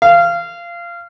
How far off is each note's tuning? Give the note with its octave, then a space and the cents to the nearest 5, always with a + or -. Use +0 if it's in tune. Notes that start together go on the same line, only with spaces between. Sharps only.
F5 -20